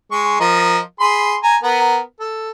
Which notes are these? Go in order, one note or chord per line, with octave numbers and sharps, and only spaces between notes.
G#3 C#6
F3 A#4 D#5
G#4 B5 C6
G#5 A#5
B3 A#4
A4